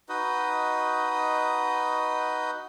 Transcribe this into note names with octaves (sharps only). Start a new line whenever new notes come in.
D#4 F#4 B4 D#5